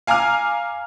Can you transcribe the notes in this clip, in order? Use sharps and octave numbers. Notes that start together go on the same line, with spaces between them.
F5 G#5 A#5 D6 F6